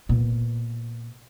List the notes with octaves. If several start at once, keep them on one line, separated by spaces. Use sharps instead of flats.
A#2 B3